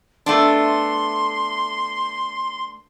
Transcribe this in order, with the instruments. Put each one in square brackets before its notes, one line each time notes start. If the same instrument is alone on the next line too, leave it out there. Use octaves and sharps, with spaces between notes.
[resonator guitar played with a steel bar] A3 B3 D4 [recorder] C6